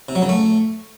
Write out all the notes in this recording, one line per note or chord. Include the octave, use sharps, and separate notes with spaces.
C3
F#3
C#3
A3